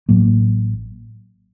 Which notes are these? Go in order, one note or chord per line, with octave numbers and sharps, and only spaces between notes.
A1 A2 F#3 A#3